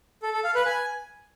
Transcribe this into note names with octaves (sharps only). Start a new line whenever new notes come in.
A4
A4
F5
B4
G#5